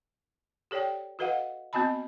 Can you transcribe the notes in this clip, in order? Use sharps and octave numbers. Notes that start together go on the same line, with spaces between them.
G4 A4 C#5 D5 G5
F#4 A4 B4 D#5 F5 F#5
B3 C4 F#4 D#5 A5 B5